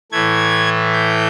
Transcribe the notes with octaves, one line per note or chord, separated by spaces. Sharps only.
A2 E3 A3 G#6
G6